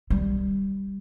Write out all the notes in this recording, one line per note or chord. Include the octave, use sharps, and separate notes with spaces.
G3